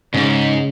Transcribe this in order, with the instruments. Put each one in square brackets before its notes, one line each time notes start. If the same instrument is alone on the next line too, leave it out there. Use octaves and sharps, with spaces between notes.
[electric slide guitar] G#2 [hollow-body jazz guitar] C#3